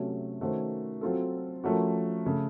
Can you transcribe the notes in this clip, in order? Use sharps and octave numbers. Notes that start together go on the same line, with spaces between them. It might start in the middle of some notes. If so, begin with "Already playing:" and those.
Already playing: C3 F#3 A3 C#4
D#3 A3 C#4 F#4 C5
F#3 C4 F4 A4
F3 A3 C#4 F#4 A#4
C#3 A3